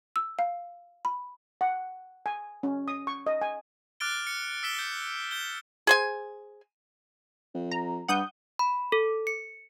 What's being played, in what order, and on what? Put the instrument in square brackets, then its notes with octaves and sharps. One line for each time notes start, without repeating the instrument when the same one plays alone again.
[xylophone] E6
F5
B5
[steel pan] F#5
G#5
C#4
D#6
C#6
D#5
G#5
[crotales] D6 F6 F#6 A6 D7 G7
C#7
E6 B6 E7 G7
G6
G6 G7
[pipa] G#4 C5 G#5
[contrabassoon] F2
[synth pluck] A#5
[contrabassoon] G2 [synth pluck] F#5 D#6 G6
[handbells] B5
A4
C#7